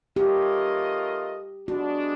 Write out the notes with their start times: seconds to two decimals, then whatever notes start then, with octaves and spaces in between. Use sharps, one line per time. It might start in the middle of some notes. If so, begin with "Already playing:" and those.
0.16 A3 C#4 F4 G4 A#4 D#5
1.68 G#3 B3 D4 F#4